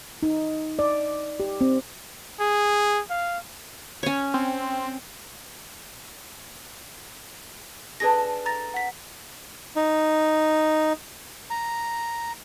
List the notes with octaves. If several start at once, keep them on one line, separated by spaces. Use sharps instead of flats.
D#4
D5
G4
C4
G#4
F5
C#4 C#5
C4
D4 G#4 A4 B4 A#6
A#5 A6 A#6
F#5 B6
D#4
A#5